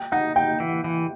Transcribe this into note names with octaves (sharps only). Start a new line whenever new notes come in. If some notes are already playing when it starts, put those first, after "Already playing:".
Already playing: G5
D#4 F#5
D#4 G5
E3
E3